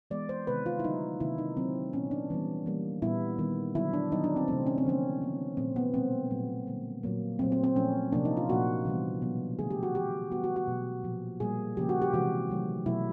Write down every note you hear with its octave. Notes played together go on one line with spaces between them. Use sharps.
E3 G#3 B3 D5
C5
C3 D#3 G#3 B3 B4
F4
E4
D3 F#3 A3 D#4
C3 D#3 F#3 A#3 E4
D#4
D3 F#3 A#3 C4
A#2 F#3 B3 C#4
D4
E3 G3 B3
E3 G3 A#3
A#2 G3 B3 E4
D#3 G3 B3
D3 F#3 B3 E4
D4
D#3 F#3 B3 D#4
D4
C4
C3 E3 A3 C4
C#4
C4
D3 F3 A#3 C#4
D#3 F#3 B3
A#2 F3 A3 C4
B3
B2 G3 A#3 C4
A#2 F#3 A3
D3 G3 A#3
A#2 F#3 A#3
A#2 F#3 A3 C4
C4
C4
A#2 F3 A3 C#4
C3 F3 A#3 D4
D#4
F4
A#2 F3 A#3 F#4
C3 E3 G3 B3
B2 F#3 B3
D3 F3 A3 G#4
G4
F#4
E3 A3 G4
E3 G3 B3 F#4
F#4
F#4
B2 F#3 A3
A#2 F3 A#3
A#2 G3 A#3 G#4
C#3 F3 A#3 G4
F#4
G4
C3 E3 G#3 F#4
D#3 F#3 A3
B2 F#3 A3 E4